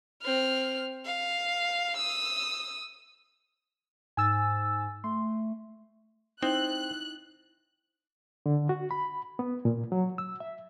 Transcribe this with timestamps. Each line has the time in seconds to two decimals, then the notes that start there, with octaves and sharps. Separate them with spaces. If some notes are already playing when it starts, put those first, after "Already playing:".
0.23 C4 F6
1.05 F5
1.97 D#6 E6
4.17 G#2 G#5 E6 A6
5.04 A3 C6
6.43 C4 D#4 E4 F#6
8.46 D3
8.69 F#4
8.91 B5
9.39 B3
9.65 A#2
9.92 F#3
10.18 E6
10.40 E5